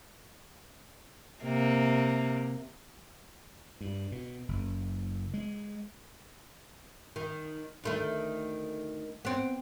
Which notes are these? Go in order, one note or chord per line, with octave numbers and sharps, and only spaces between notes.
C3 A#3
G2
B2
F#1
G#3
D#3
D2 D#3 A3
B3 C4